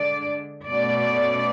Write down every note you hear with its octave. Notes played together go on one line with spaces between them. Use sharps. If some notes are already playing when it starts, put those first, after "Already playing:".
Already playing: D3 G#3 D4 D5
B2 A3 C#4 D5